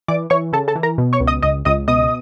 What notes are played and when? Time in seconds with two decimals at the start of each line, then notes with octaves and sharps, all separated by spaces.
0.08 E3 D5 D6
0.30 E3 C#5 C#6
0.53 C#3 A4 A5
0.68 A4 A5
0.76 E3
0.83 A#4 A#5
0.98 B2
1.13 C#5 C#6
1.20 C#2
1.27 D#5 D#6
1.42 C#2 D#5 D#6
1.65 C#2 D#5 D#6
1.88 B2 D#5 D#6